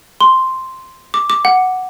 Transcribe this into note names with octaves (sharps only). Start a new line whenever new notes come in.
C6
D6
D6
F#5